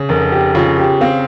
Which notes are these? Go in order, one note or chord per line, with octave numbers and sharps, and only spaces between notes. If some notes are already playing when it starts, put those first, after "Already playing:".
Already playing: C#3
F1 A#4
G4
C#3 F4
G4
C4 F5